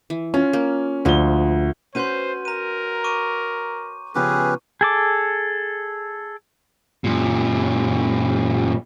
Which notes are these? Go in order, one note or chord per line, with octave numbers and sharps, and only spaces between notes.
E3
C#4 F4
A#3
D2 D3 F3 G7
C#4 F#4 B4 C5 C6 G6 D#7
A#4 A#5 D#7
C#6 D6 D#7
C#3 F3 B3 C#4 G4 G#4 B4
G#4 A4 D6
F#2 A#2